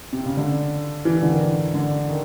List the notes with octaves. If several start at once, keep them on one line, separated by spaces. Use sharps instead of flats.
C3
C#3
D3
E3
D3
D#3
D3
D#3